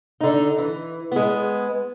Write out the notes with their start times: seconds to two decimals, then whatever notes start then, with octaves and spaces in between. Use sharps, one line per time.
0.20 D3 D#4
0.58 E3
1.12 G#3 B3